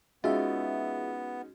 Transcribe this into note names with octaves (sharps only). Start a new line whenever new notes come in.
G#3 B3 C#4 D#4 F4 F#4 G#4 E5